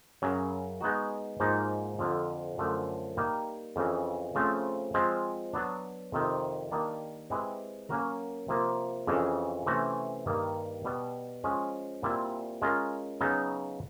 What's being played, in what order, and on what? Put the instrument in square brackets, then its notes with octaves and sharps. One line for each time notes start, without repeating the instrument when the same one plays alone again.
[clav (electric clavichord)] F#2 C#3 F#3
G#3 B3 D#4 F#4
G#2 F3 A#3 D#4
F2 D3 F3
F#2 D3 F3 A3 D4
G3 A#3 D#4 G4
F2 C#3 E3
C#3 F3 A3 C4
F3 G#3 C4
F#3 B3 D4
F2 C3 D#3
D#3 G3 A#3 D4
G#3 C4 E4 G4 B4
F#3 A#3 C#4 F#4 A#4
C3 F3 A#3
F2 C#3 E3
C3 E3 A3 C#4 F#4
G2 D#3 G3 A#3
B2 G3 B3
F3 G#3 C#4
A#2 G3 C4 E4
G#3 C#4 F4 A#4
C#3 F#3 B3 D#4